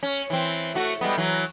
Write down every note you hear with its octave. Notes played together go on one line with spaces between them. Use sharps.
C#4
E3 C4
A3 F#4
G3 G#3 B3
E3 F#3